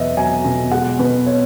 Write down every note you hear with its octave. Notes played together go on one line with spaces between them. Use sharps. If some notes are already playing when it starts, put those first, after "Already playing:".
Already playing: E2 B2 F#3 B3 D#5 E5
F#3 G#5
B2
G#3 F#5
B2 B4
C#5